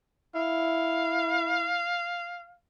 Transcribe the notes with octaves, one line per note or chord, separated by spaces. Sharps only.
E4 F5